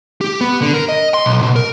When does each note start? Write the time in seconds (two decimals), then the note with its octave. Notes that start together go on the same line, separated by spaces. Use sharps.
0.21 G4
0.41 B3
0.62 D3
0.74 A#4
0.89 D#5
1.14 C6
1.26 B1
1.43 B2
1.56 A#4